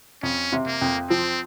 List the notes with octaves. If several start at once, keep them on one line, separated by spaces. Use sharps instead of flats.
F2 C#4
C3
A#3
F2
F3 C4